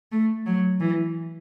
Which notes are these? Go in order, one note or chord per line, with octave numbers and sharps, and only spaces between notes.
A3
F#3
E3